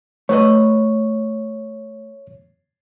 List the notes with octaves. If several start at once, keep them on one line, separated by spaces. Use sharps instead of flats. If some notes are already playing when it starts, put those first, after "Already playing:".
A3 B4 C#5 D#5